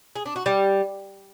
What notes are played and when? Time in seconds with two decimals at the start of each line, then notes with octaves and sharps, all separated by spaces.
0.15 G#4
0.26 D4
0.36 F#4
0.46 G3